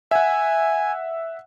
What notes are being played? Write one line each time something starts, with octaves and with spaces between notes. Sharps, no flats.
E5 F#5 G#5